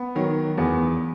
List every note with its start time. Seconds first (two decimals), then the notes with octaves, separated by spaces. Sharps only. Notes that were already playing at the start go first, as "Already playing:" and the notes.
Already playing: B3
0.15 D#3 F#3
0.57 E2 B3